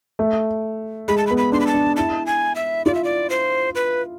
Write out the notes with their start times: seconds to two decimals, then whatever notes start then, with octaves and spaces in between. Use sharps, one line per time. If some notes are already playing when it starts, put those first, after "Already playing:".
0.19 A3
1.08 G#3 B5
1.18 A5
1.27 B5
1.31 B3
1.37 B5
1.52 D4 C6
1.60 B5
1.67 A5
1.74 D4
1.96 E4 A5
2.26 G#5
2.56 E5
2.86 F4 D5
2.95 E5
3.04 D5
3.30 C5
3.75 B4